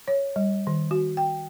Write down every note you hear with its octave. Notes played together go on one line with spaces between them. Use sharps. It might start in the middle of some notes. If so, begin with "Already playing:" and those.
C#5
G3
D#3
F#4
G5